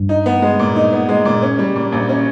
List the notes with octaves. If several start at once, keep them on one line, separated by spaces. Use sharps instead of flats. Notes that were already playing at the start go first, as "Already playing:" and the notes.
Already playing: G2
D#4
B3
G#3
A#2
D#4
B3
G#3
A#2
C#4
G3
A#2
A#1
C#4